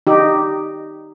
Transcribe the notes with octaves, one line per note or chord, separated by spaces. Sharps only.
D#4 G4